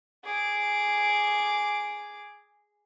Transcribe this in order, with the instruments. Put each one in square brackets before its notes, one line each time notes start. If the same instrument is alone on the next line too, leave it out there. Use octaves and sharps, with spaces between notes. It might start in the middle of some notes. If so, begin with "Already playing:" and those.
[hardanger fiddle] G#4 D6